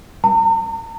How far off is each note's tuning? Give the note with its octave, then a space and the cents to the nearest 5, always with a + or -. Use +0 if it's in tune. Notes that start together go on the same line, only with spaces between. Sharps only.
A#5 -45